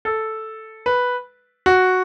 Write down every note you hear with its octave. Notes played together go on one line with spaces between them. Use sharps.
A4
B4
F#4